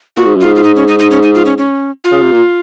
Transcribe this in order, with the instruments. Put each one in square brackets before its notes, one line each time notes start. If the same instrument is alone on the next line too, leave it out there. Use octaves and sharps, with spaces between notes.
[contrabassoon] A#2 [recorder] F#4
[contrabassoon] G#2
[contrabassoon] F#2 [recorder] F4
[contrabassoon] G#2
[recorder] F4
D#4
C#4
D#4
D#4
C#4
D#4
F4
C#4
C#4
F4
[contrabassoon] C#3
C3
A#2